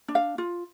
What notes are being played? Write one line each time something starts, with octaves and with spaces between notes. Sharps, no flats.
D4
F5
F4